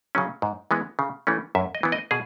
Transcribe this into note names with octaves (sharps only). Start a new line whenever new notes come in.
C#3 F#3 C#4
G#2
E3 G#3 B3
C#3
E3 A3 C#4
F#2 E5
D#5
E3 B3
D#5
B2 G#4